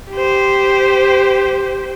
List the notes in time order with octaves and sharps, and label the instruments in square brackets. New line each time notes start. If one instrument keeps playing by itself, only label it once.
[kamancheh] G4 C5